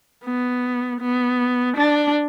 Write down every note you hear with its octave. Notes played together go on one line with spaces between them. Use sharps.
B3
B3
D4